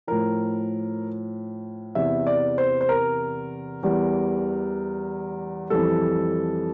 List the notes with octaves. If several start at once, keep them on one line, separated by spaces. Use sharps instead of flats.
A2 F3 A#4
E2 C3 E3 E5
D5
C5
C5
A#4
E2 E3 G3
F2 E3 G3 A4